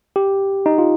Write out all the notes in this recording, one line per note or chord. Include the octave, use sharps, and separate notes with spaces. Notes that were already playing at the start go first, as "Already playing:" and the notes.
G4
D#4
F4